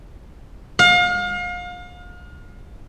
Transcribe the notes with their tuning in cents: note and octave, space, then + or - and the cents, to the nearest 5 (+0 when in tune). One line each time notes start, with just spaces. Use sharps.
F5 +35